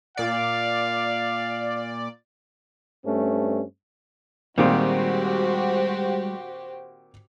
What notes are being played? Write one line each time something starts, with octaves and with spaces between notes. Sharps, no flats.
A#2 D5 F5
G2 A3 C4 C#4
A#2 D#3 G3 G#3 C4 F#4 G4 C5